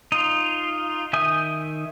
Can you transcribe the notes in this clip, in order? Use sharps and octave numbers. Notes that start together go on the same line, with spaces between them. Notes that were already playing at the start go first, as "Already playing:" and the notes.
D#4 F4
D#3 E5 G#5 D#6 G6